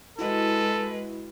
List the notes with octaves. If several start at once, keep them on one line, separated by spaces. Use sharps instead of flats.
G#3 E4 F#4 A4 B4 D#5